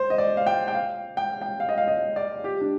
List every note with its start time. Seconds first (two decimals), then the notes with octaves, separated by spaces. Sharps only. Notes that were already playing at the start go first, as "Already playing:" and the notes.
Already playing: C5
0.10 D#5
0.18 D5
0.37 F5
0.47 G5
0.68 G5
0.74 F5
1.17 G5
1.42 G5
1.60 F5
1.69 D#5
1.78 F5
1.88 D#5
2.16 D5
2.44 G4
2.61 D4